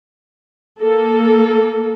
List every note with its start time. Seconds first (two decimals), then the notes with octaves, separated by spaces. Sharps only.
0.80 A#3 A4